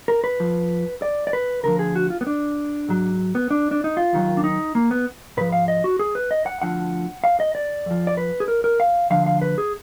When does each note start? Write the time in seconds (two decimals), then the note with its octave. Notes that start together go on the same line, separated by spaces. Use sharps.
0.08 A#4
0.24 B4
0.40 F2 F3
1.02 D5
1.27 D5
1.33 B4
1.63 D2 D3 F3 A#4
1.79 G#4
1.95 F#4
2.10 F4
2.21 B3
2.27 D4
2.89 G#2 F#3
3.35 B3
3.51 D4
3.71 D4
3.84 D#4
3.97 F4
4.13 D#2 D#3 F#3
4.37 D4
4.44 D#4
4.75 A#3
4.91 B3
5.37 G#2 F3 B4
5.52 F5
5.68 D#5
5.84 F#4
5.99 G#4
6.15 B4
6.31 D#5
6.46 F#5
6.62 D2 D3 F3 F#5
7.24 F5
7.40 D#5
7.55 D5
7.86 F2 F3
8.07 D5
8.17 B4
8.40 G#4
8.48 A#4
8.64 A#4
8.80 F5
9.10 D2 D3 F3 F5
9.26 F5
9.42 B4
9.58 G#4